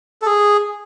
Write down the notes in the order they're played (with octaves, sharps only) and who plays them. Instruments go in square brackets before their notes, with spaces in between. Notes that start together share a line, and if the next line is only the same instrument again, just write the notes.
[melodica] A4
G#4